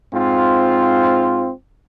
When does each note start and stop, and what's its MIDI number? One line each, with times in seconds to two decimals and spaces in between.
0.13 1.51 44
0.13 1.51 60
0.13 1.51 65